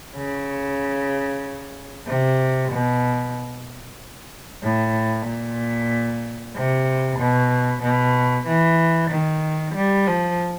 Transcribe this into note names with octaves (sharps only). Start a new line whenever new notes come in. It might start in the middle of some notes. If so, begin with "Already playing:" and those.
C#3
C3
B2
A2
A#2
C3
B2
B2
E3
D#3
G3
F3